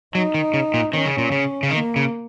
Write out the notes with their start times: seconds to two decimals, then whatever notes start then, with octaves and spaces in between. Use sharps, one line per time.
0.15 F#3 D#4
0.34 D#3
0.54 C#3
0.74 A#2
0.93 D#3 C#4
1.06 C#3
1.18 A#2
1.32 C#3
1.63 C#3
1.70 D#3 A#3
1.96 C#3